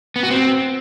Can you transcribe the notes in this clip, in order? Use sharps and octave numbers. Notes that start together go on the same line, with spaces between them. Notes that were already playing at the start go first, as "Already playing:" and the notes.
B3
F#4
C4